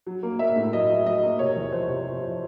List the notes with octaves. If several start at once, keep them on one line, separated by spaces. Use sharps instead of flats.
F#3
A#3
A#3 E5
A2
F#3 D#5
F#3
F#3 D#5
A#3
C3 C#5
E2
F3 C5
C3
F3
F3